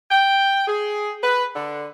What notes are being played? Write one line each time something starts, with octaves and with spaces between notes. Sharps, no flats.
G5
G#4
B4
D3